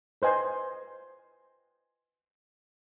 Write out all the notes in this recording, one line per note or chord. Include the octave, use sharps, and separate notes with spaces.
B4 C5 D#5 G#5